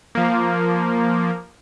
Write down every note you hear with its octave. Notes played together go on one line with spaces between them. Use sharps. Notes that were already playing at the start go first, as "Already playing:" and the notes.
F3 A#3